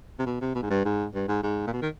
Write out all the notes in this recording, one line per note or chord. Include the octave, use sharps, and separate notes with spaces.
C3
B2
C3
B2
G#2
G2
G#2
G2
G#2
G#2
A#2
B2
D#3